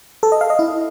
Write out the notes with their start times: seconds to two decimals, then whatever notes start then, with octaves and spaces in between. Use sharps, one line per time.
0.23 A4
0.32 D#5
0.41 F5
0.50 D#5
0.59 E4